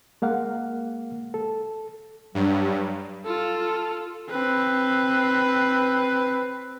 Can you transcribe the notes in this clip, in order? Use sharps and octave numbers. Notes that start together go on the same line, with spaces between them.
G#3 A#3 F5 F#5
A4
G2 F#3
F4 A4
C4 B4